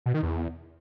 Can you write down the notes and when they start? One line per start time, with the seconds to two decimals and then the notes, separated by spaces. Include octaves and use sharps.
0.06 B2
0.14 D#3
0.23 E2